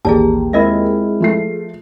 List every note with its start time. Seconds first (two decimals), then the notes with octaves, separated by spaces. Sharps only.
0.05 A1 D#2 G4 G#4 D5 A5 A#5
0.53 G#3 C4 E4 F4 G#4 A#4 D#5 E5
1.20 F3 A3 C7